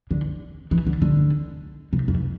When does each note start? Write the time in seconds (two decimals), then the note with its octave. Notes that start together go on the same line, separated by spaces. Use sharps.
0.11 D3
0.71 E3
0.87 D3
1.02 D3
1.93 C3
2.08 F2